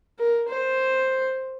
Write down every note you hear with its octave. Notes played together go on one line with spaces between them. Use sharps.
A#4
C5